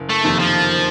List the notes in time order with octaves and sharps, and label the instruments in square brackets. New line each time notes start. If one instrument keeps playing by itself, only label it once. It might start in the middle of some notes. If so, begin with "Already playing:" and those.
Already playing: [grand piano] F#1
[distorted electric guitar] A3
[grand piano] F2 C3 D#3 A#3
[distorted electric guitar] F3